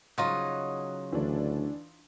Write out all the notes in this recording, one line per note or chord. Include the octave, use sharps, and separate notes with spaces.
C#3 F#3 D#4 F4 D#5
D2 E3 D4